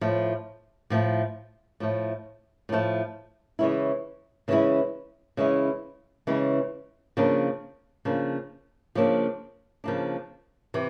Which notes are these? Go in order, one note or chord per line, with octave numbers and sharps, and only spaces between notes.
A2 F3 A3
A2 F3 A3
A2 F3 A3
A2 F3 A3
C#3 E3 G#3 C#4 E4
C#3 E3 G#3 C#4 E4
C#3 E3 G#3 C#4 E4
C#3 E3 G#3 C#4 E4
C#3 F3 A#3 D4
C#3 F3 A#3 D4
C#3 F3 A#3 D4
C#3 F3 A#3 D4
C3 E3